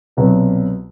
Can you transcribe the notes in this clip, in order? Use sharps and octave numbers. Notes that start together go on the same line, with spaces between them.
C2 B2 F#3 B3